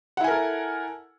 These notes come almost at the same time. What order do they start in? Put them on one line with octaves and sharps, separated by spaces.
F#5 E4 G#5 A#4 A4